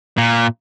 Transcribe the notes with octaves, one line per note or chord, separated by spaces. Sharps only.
A#2